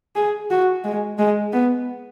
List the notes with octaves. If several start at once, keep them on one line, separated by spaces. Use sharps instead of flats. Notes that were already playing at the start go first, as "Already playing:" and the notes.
G#4
F#4
G#3
G#3
B3